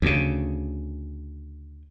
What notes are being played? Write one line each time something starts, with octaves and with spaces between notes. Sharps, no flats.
D2 C#3